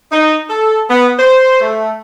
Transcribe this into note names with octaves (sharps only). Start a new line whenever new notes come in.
D#4
A4
B3
C5
A3